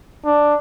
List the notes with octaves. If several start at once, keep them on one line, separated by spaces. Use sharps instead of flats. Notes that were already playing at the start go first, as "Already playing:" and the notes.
D4